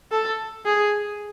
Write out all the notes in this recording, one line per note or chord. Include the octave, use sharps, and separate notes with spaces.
A4
G#4